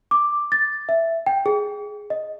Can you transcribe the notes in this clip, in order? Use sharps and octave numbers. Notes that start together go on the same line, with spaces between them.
D6
A6
E5
G5
G#4
D#5